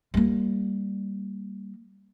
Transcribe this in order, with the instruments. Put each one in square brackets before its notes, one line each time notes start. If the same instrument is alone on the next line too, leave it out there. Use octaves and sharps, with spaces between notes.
[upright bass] G3 A#3